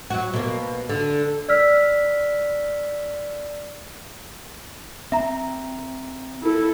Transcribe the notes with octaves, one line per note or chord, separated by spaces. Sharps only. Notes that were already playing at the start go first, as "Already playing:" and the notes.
F#3 F#4
B2 A#3
D3
D5 E6 F6 B6
C4 E5 A#5
E4 A4